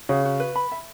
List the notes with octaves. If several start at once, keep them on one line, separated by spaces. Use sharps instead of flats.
C#3 F#4
F#4
B4
B5
E5